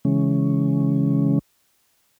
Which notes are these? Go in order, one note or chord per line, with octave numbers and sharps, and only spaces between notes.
C#3 E3 G#3 C#4